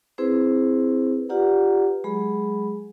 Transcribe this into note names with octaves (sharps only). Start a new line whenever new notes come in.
C4 E4 G#4 B4 C5
F4 G4 B4 D5 F#5 A#5
F#3 G#3 G#4 B5